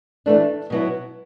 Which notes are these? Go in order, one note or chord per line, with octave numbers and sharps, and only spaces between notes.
E3 A3 D4
B2 F#3 B3 E4